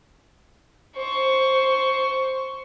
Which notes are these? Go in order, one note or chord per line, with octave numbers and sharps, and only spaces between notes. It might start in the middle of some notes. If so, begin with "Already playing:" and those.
C5 C#6